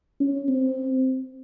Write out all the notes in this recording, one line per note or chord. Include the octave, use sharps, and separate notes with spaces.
C#4
C4